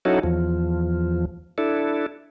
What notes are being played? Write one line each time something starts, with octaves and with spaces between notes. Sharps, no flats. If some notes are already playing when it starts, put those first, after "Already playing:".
F#3 C#4 D#4 E4 F#4 A4
E2 F3
D4 E4 A4